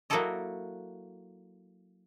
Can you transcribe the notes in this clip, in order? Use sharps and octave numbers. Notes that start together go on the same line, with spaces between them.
F#3 A#3 E4 F#4 A4 D#5